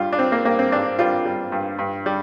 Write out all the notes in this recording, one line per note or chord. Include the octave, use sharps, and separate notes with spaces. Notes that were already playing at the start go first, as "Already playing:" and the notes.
Already playing: G2 G3 F4
D4
G3 C4
A#3
G2 A#3
C4
G2 D4
G3 F4
G3
G2
G2
G3